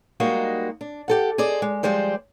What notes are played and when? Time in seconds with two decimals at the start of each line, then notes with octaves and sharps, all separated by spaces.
0.20 G3 G#3 A#3 D#4 F#4
0.81 D4
1.08 G4 A4 F#5
1.38 G#4 C5 D5 D#5
1.62 G#3
1.83 F3 G3 G#3 C5 D5